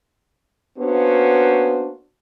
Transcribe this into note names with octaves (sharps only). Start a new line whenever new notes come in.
A#3 B3 C#4 D4 F#4 C5